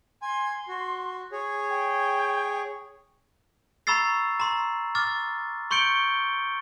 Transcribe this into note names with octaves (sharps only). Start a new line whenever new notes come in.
G#5 C6
F#4
G#4 C#5
G5
A#5 B5 C#6 E6 A6 C7
A#5 C6
D6 F6 A6
C6 C#6 G6 C#7 D7 G7